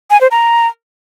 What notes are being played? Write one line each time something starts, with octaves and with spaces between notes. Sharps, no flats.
G#5
C5
A#5